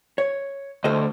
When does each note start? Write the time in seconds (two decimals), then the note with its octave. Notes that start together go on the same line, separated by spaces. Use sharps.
0.18 C#5
0.84 D2 A4 C5 D#5